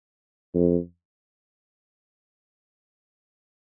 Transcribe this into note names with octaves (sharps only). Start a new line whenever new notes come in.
F2